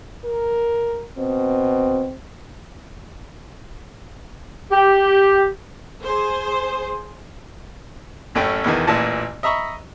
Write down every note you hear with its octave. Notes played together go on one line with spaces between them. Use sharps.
A#4
B2 C4
G4
G#4 C5
A1 F#2 A3 C#4 G5
E2 B2 D#3 E3
A1 A#2 E3 F4 A5
D#5 E5 A#5 B5 C#6